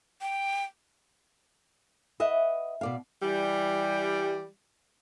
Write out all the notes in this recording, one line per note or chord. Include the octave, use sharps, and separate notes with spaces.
G5
B4 D#5 E5 F#5
B2 D5 F5
E3 G3